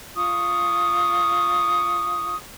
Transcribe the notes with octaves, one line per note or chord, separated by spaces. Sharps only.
F4 C#6 D#6